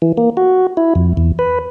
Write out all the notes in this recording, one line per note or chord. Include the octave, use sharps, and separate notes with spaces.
E3
A#3
F#4
E4
F2
E2
B4